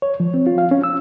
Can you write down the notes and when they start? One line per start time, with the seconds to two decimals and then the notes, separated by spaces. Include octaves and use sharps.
0.02 C#5
0.20 F3
0.34 C4
0.47 F4
0.58 F5
0.71 C#4
0.84 E6